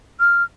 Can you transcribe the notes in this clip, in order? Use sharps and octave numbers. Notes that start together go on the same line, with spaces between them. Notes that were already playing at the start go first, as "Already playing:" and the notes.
F6